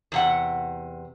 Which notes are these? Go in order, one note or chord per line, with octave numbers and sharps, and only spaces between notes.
E2 C3 F#5